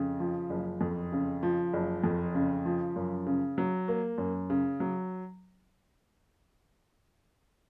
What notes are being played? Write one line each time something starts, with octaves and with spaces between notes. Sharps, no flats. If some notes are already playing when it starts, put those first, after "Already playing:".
Already playing: F2 C#3
F3
F#1
F2
C#3
F3
F#1
F2
C#3
F3
F#2
C#3
F#3
A#3
F#2
C#3
F#3